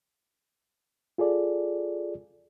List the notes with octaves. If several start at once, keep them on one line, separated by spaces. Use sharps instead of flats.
F4 G#4 A4 D5